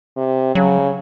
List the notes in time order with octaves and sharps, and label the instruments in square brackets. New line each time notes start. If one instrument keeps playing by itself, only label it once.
[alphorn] C3
[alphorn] C#3 [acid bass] F#3